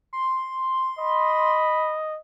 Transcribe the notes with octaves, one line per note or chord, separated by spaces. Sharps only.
C6
D#5 B5